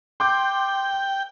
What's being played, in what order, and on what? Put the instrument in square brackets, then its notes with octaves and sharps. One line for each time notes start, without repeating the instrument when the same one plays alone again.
[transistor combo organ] G5 [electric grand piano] C6 D6 G6